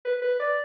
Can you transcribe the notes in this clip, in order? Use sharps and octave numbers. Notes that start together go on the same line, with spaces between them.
B4
B4
D5